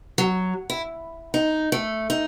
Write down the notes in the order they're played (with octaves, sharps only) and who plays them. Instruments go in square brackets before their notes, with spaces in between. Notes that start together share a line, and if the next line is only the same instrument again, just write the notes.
[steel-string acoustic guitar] F#3
E4
D#4
A3
D#4